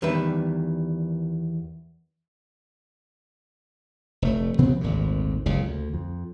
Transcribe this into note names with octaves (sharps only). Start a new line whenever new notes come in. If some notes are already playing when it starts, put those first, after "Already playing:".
E2 D#3 G3 D4 B4 E5
F1 A3
C3 F3 B3 C4
G#1 D2 A#2
F#1 C#2 C#3
D2
F2